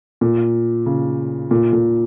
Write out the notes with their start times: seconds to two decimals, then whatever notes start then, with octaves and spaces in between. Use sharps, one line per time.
0.21 A#2
0.86 C#3
1.51 A#2
1.73 A#2